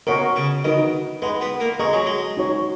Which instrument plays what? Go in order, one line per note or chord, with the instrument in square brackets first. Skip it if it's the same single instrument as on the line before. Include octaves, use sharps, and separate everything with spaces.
[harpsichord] B2 [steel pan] A#4 C#5 F#5 A#5 C#6
[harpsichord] C#3
[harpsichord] D#3 [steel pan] D#4 F#4 B4 D#5
[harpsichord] G#3 [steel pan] B4 F#5 B5
[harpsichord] B3
A#3
[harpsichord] G#3 [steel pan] G#4 D#5 A#5 C#6
[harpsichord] F#3
G#3
[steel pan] D#4 F#4 C#5